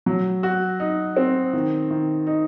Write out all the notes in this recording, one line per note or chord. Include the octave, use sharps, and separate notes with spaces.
F#3
F#4
D#4
C4
D#3
D#3
D#4